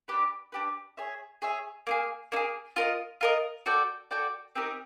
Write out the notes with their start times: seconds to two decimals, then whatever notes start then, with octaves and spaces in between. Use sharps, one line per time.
0.08 D4 G4 B4
0.52 D4 G4 B4
0.97 G#4 C#5 E5
1.42 G#4 C#5 E5
1.87 A#3 D#4 G#4
2.32 A#3 D#4
2.36 G#4
2.76 F4 A#4 D#5
3.21 F4 A#4 D#5
3.66 F#4 A4 D5 G5
4.11 F#4 A4 D5 G5
4.56 C4 D#4 G4 A#4